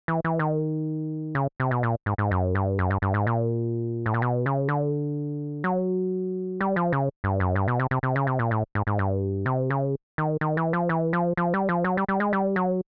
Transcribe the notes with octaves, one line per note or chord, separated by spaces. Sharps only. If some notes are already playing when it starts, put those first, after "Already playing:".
E3
E3
D#3
C#3
C3
B2
A#2
G#2
G#2
F#2
G2
F#2
G2
G2
G#2
A#2
A2
A#2
B2
C#3
D3
F#3
G3
F3
C#3
G2
F#2
G2
B2
C3
C3
C3
C#3
C3
A#2
A2
G#2
G#2
G2
C3
C#3
D#3
D#3
E3
F3
E3
F3
F3
G3
F3
F#3
G3
G3
G#3
G3
F#3